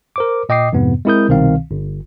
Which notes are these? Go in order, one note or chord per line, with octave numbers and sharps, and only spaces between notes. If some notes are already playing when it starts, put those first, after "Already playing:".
A#4 C5 D6
A#2 D#5 G5 D6 D#6 C7
F2 G#2 C3 B3
G#3 C4 E4 A#4 D#6 G6
C2 B2 D#3 C4 F5
G1